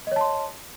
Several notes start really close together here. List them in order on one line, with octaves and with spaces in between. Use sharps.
D#5 C#5 A5 C6